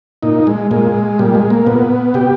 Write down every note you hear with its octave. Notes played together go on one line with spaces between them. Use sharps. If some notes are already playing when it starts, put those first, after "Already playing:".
A#2 D#4
G#3
A#2 G#3
A#2 G3
G#3
A#3
A#2 B3
B2 G4